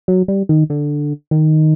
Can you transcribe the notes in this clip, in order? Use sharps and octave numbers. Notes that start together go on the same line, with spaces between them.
F#3
G3
D#3
D3
D#3